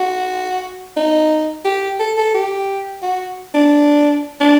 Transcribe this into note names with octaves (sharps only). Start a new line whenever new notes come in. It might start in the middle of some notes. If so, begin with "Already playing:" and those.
Already playing: F#4
D#4
G4
A4
A4
G4
F#4
D4
D4